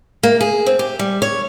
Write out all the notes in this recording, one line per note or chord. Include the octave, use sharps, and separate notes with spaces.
A#3
G#4
C4
G4
G3
C#5